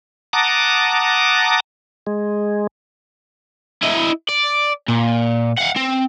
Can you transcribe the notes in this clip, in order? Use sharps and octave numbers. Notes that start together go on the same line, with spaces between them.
F#5 A5 A#5 D6 D#6
G#3
E4 D#5
D5
A#2
F5 F#5
C4